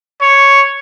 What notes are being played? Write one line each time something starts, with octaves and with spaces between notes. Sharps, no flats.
C#5